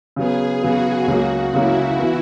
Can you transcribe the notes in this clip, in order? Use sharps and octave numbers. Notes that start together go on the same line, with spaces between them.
C#3 F#3 B3 G#4
C#3 F#3 B3 F#4
C#2 C#3 F#3 A#3
C#2 C#3 F#3 A#3 E4
E3 B3